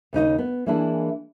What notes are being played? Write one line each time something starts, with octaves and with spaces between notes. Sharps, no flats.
D#2 C#3 D#4 D#5
B3
E3 G#3 A#3 D4 E4